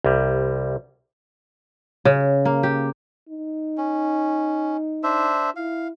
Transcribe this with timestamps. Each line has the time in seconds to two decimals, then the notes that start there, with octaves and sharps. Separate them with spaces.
0.04 C2 G3
2.05 C#3
2.45 A#3
2.63 G4
3.29 D#4
3.78 C#4
5.03 D4 C5 E5
5.56 E4 F5